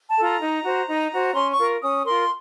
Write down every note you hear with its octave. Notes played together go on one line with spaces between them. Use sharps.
A5
F4 A4
A#5
D#4
F#4 C5
D#4
F#4 C5
C#4 C6
C#6
F4 A#4
C#4 D#6
F4 A#4 C6